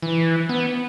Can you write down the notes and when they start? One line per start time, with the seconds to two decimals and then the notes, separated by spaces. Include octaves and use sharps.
0.03 E3
0.49 B3